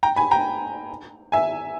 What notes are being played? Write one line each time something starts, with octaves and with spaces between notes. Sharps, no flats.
G5 A#5
G#5 B5
G5 A#5
E5 G#5